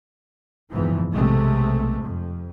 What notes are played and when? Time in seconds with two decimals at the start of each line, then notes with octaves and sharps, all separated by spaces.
0.71 F#1 E2 G#2 E3 F3
1.12 B1 C3 G#3 A3
2.01 F2